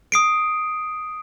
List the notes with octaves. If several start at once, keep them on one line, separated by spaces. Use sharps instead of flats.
D#6 C7 D7